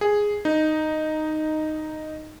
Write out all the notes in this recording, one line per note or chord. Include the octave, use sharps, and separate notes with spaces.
G#4
D#4